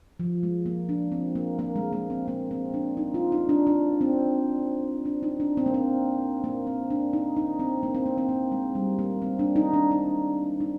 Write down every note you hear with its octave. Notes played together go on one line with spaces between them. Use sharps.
F3
G#3
A#3
D4
C4
A#3
A#3
G#3
A#3
C4
A#3
C4
D4
D#4
F4
D#4
D4
D4
C4
D4
D#4
D4
C4
A#3
C4
A#3
C4
D4
D#4
D#4
C4
A#3
C4
A#3
C4
A#3
G#3
G3
A#3
C4
D4
D#4
D4
D#4
D#4